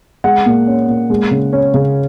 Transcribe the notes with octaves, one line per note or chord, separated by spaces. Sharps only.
G#3 F#5
A#2
C#4
A#2
G#3
C#3
C#4
C#3